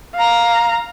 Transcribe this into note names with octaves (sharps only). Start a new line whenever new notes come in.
F5 A#5